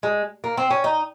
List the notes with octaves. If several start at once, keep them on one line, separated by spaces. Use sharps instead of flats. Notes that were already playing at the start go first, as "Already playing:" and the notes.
G#3
A#3
C4
C#4
D#4